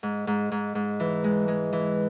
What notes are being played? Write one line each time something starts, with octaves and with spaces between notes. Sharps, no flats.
G#2
G#2
G#2
G#2
E3
G#3
G#3
E3